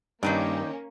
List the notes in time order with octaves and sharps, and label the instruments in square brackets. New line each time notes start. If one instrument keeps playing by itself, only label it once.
[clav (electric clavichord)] G2 [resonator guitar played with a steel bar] D#3 D#4 D5 [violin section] A#3 C#4